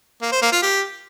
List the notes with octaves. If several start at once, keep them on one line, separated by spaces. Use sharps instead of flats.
A#3
C5
A#3
F4
G4